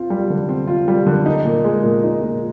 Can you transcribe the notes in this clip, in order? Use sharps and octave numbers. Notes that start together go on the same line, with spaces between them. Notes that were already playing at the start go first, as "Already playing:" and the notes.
Already playing: C4 F4
G3
D3
C4
F4
G3
D3
D#4
A#2
G#3
A#2
D#4
A#2